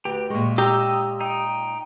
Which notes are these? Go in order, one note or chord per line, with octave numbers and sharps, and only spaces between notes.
D2 G4 B4
A#2 G#3 C#6
D#4 G4 D#5 A#5 E6
D#4 G5